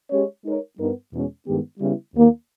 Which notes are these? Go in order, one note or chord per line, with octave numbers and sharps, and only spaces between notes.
G#3 C#4 G4 C#5
G#3 D#4 A#4 C#5
G2 G3 B3 D#4 A#4
E2 B2 G#3 C#4
G2 D#3 G#3 B3 G4
C#3 G3 B3 E4
D#2 D#3 A#3